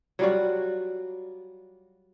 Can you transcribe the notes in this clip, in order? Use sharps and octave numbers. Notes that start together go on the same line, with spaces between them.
F#3 G3 F4 F#4